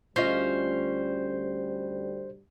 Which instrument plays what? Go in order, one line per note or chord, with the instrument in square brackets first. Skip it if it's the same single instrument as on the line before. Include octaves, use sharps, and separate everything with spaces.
[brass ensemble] D2 G3 [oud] C#4 F4 D#5 [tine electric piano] C5 G6 C7